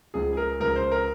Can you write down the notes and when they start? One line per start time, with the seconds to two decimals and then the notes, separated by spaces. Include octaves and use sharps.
0.14 C#2 C#3 F3 G#4
0.33 G#4
0.37 A#4
0.60 C#2 C#3 F3 A#4
0.76 C5
0.91 A#4